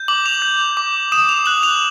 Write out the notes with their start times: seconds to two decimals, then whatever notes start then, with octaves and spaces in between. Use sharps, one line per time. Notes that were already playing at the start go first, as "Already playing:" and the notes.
Already playing: G6
0.08 D6 F#7
0.26 F7
0.42 G6
0.77 D6
1.12 D#6 E7
1.29 F7
1.46 F#6 F#7
1.63 F7